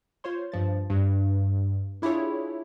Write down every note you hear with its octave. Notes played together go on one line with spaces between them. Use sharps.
F4 C5 C#5 C6
G2 F3 A6
G2
D4 E4 F4 G4 G#4 C#5